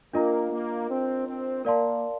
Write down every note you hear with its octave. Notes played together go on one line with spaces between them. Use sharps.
A#3 D4 F4 A#4 D#5 A#5
A#3
C4
C4
A#3 A#4 D5 F5 A5 C6